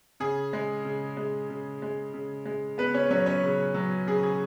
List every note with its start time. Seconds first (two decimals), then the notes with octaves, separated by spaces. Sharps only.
0.20 C#3 G#4
0.53 G#3
0.85 C#3
1.17 G#3
1.50 C#3
1.82 G#3
2.14 C#3
2.46 G#3
2.78 C#3 B3 B4
2.94 C#4 C#5
3.10 F#3 C#4 C#5
3.26 C#4 C#5
3.43 C#3
3.74 F#3
4.07 C#3 G#4
4.23 G#4